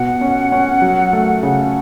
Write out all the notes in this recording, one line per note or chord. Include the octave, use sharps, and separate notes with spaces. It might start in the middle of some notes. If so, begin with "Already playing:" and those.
Already playing: B2 F#5
C#4
C#4
F#3
A3
C#3